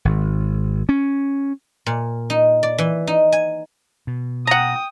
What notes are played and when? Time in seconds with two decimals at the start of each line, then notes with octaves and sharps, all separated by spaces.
0.05 G#1
0.89 C#4
1.86 A#2
2.30 D#4
2.63 D5
2.78 E3
3.07 D#4
3.32 G#5
4.07 B2
4.47 F#5 G5 A#5 D#6